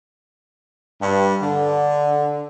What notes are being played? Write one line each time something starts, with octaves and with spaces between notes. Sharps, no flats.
G2
D3